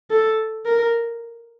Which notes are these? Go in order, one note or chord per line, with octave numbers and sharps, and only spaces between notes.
A4
A#4